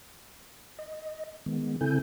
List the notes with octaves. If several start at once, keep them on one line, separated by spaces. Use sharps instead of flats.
D#5
D#3 G#3 B3
C#3 C4 E4 A4 G#5 G6